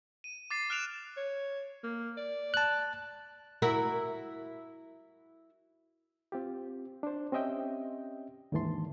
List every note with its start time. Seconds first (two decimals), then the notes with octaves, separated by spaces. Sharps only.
0.24 D#7
0.50 D6 A6 C7
0.70 F6 F#6 D7 E7 F7
1.17 C#5
1.84 A#3
2.18 D5
2.54 A5 F#6
3.62 E4 F#4 A#4
6.32 C4 F4 G4
7.03 D4 C5
7.32 C4 C#4 G4 D#5 E5 G5
8.52 D#2 G#2 D3 E3 A5 C6